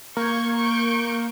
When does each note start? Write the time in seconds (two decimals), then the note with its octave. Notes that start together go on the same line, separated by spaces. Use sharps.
0.17 A#3 C#6 G6 G#6
0.55 C#6 G6 D7